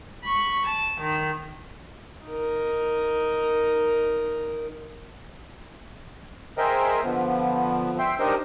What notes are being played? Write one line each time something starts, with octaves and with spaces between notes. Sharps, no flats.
B5 C#6
A5
D#3
D#4 A#4
G#4 A#4 C5 D#5 E5 G5
D3 F3 B3
E5 G5 C6
D4 D#4 G4 A#4 C5 D#5